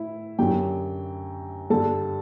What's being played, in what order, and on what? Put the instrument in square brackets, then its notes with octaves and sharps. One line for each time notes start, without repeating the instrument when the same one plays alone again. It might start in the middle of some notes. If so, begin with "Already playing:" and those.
Already playing: [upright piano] A2 E4 E5
F#2 D3 F#3 G4 G5
G2 D3 G3 A4 A5